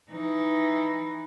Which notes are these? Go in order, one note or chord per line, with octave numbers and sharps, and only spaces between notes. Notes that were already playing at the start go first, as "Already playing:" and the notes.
E3 D#4